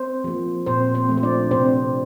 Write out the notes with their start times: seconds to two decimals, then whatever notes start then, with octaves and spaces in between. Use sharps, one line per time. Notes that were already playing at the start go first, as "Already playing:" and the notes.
Already playing: C4 C5
0.24 F3 A#3
0.66 A#2 C4 C5
0.95 C4 C5
1.09 F3 A3
1.17 C5
1.23 D4 D5
1.51 C3 C4 C5